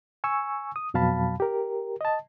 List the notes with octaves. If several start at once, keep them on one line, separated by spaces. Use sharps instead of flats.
G#5 C#6 E6
D#6
F2 B2 F#3 F5 A5 B5
G4 A#4
D#5 A5